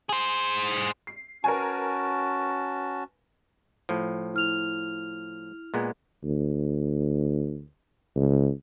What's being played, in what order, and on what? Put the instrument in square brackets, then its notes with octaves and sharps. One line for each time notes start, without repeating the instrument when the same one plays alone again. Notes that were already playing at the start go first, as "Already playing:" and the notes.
[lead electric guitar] G#4 C5
[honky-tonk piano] C7
[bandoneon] C#4 F#4 A5 [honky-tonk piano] A#4 B4 G#5
[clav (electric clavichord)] A2 F3
[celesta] E4 F6 F7
[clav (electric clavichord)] A#2 G#3 B3
[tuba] D2
C#2